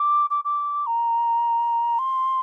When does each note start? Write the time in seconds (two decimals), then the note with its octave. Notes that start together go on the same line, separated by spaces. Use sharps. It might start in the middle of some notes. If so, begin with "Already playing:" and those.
Already playing: D6
0.30 D6
0.45 D6
0.86 A#5
1.99 C6